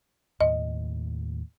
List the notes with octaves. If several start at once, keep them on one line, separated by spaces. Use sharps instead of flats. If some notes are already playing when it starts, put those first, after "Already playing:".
D#2 A2 D#5